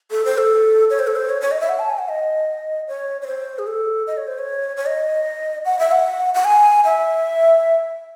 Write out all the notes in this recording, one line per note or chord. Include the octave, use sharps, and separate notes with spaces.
A4
C5
A4
C#5
C5
A4
C5
C#5
C#5
D#5
E5
F#5
A5
G#5
F#5
D#5
C#5
C#5
C5
G#4
A4
D#5
C#5
C5
C#5
C#5
D#5
F#5
E5
F#5
F#5
G#5
E5